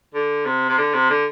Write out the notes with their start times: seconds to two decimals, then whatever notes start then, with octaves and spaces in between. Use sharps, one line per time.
0.14 D3
0.45 C3
0.69 C3
0.78 D3
0.93 C3
1.10 D3